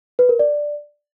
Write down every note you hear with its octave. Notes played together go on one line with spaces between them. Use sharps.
B4
A#4
D5